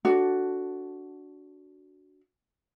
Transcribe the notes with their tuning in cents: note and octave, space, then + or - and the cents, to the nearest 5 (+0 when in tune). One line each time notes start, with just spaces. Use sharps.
D4 -15 F#4 +0 A4 +0